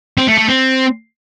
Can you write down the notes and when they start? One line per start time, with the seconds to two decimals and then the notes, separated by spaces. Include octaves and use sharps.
0.18 C4
0.28 A3
0.38 A3
0.48 C4